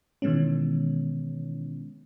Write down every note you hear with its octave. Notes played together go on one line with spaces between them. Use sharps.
B2 D#3 E3 G#3 B3 C#4